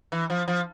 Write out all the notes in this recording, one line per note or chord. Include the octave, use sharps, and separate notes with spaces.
E3
F3
F3